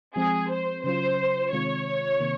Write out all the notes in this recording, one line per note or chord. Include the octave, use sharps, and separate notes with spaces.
F3 G#3 C4 G#4
C5
C#3 F#3 C#4 F4 C5
C3 D#3 G#3 C4 F4 C#5
C3 D#3 A#3